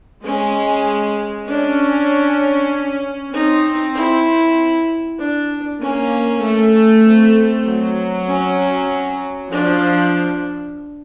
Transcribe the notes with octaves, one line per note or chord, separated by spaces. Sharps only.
G#3 C#4
C#4 D4
C4 D#4
E4
D4
A#3 C#4
A3
C4
F#3
C#4
F3 D4